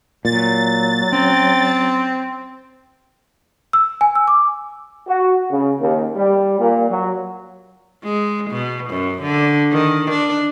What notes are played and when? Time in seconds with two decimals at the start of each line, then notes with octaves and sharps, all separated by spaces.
0.25 A#2 F#3 A6
1.12 C4 C#4
3.73 E6
4.01 G#5
4.15 E6
4.28 D6
5.08 F#4
5.51 C#3
5.81 D#2
6.16 G3
6.59 A#2
6.89 F#3
8.04 G#3
8.50 B2
8.90 F#2
9.22 D3
9.72 D#3
10.11 D4